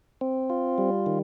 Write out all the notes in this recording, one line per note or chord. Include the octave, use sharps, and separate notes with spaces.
C4
F4
G3
D#3